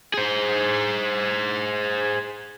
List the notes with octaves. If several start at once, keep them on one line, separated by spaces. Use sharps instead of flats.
G#4 C5